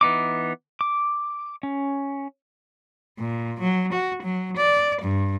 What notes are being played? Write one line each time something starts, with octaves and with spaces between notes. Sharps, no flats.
E3 B3 D#4 D6
D6
C#4
A#2
F#3
F#4
F#3
D5
G2